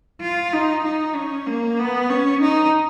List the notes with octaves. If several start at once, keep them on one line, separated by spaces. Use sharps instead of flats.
F4
D#4
D#4
C#4
A#3
B3
C#4
D#4